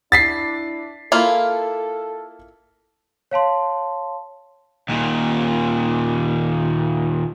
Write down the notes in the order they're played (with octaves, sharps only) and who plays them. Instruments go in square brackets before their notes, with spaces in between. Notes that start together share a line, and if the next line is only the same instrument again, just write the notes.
[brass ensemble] D4 E4 [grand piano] A6 B6 C7
[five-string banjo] A#3 E4 F4 [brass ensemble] A4
[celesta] C#5 F5 A5 C6
[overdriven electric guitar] D#2 A#2